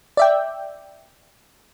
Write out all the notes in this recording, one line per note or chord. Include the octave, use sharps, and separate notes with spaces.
D5 E5 G5